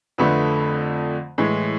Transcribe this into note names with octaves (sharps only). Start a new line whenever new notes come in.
F2 D3 A3 B4
A2 E3 G#3